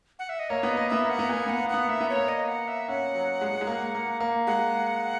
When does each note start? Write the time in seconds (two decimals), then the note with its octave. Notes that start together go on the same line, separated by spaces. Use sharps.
0.19 F#5
0.29 E5
0.39 D#5
0.50 A#3 C#5
0.63 B3
0.69 D#5
0.77 A#3
0.90 B3 E5
1.05 A#3 F#5
1.19 B3
1.29 A#3 G#5
1.47 B3 F#5
1.60 A#3
1.69 B3 F#5
1.88 A#3 E5
2.01 B3
2.09 C#5
2.16 A#3
2.28 D#5
2.48 F#5
2.68 E5
2.88 C#4 F#5
3.15 F#3
3.41 G#3
3.61 G#3
3.67 A#3
3.95 A#3
4.20 A#3
4.47 G#3 F#5